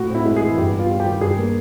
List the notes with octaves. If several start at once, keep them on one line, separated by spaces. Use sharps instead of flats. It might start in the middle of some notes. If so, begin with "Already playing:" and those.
Already playing: A2 F#4
C4 E4
G#3
G#4
E3
G2 G4
B3
F4
G3
G4
D#3
G2 G#4
A#3